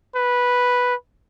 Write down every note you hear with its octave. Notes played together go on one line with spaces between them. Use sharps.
B4